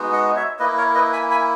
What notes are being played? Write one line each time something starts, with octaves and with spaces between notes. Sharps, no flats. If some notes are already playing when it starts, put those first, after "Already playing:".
Already playing: G#3 B3 D#4 F#4
D#5 F#5
C#5 E5
A#3 E4 B4 D#5
A#4 C#5
B4 D#5
G#5 B5
G#5 B5